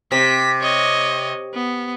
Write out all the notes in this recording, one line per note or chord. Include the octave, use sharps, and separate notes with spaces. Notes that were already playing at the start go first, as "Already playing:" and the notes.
C3 B6
C#5 D#5
B3